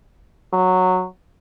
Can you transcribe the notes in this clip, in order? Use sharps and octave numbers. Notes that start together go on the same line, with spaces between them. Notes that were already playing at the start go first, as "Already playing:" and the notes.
F#3